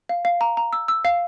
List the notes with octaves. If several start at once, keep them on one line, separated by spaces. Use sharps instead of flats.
F5
F5
A#5
A#5
E6
E6
F5